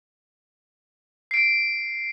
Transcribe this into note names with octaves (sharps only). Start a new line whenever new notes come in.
C7 D7